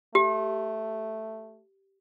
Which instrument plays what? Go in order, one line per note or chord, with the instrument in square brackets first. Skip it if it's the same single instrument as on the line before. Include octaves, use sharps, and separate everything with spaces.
[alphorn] A3 [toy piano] G4